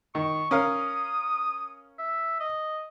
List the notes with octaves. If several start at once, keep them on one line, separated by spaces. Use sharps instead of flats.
D#3 C#6
C#4 A#4 F5 D#6
E5
D#5